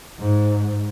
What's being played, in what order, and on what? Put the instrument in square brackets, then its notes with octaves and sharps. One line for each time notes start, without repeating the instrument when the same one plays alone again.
[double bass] G#2